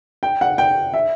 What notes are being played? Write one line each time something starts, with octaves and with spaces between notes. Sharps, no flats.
G5
F#5
G5
E5